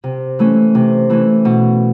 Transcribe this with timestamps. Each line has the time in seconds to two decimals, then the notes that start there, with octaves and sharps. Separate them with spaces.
0.04 C3
0.39 E3 A3 C#4
0.75 C3
1.10 E3 A3 C#4
1.45 B2